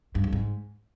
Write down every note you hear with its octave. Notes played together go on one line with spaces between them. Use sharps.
G2
F2
G#2